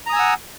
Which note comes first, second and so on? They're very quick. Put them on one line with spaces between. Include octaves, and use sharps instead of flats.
A#5 D#6 G#5 E6 F#5